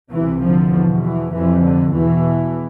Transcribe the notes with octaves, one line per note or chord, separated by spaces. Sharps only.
C2 C3 E3
D3 F3
E2 B2
E3
F2 C3 E3
D3
E2 B2 E3